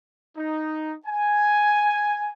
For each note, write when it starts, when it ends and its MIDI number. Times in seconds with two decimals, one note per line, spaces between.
0.37 0.94 63
1.05 2.32 80